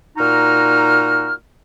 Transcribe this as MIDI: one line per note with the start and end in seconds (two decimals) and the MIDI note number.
0.17 1.31 46
0.17 1.31 63
0.17 1.31 66
0.17 1.31 82
0.17 1.31 89